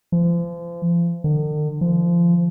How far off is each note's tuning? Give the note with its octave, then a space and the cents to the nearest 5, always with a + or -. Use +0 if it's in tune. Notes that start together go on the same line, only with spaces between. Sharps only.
F3 -35
D3 +45
F3 -25